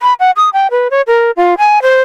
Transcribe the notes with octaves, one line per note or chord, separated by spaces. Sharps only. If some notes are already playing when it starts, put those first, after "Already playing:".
B5
F#5
D#6
G5
B4
C#5
A#4
F4
G#5
C5